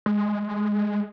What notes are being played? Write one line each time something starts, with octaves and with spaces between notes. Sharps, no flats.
G#3